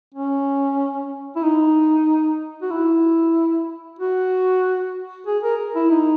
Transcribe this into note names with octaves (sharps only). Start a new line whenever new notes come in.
C#4
E4
D#4
F#4
E4
F#4
G#4
A#4
E4
D#4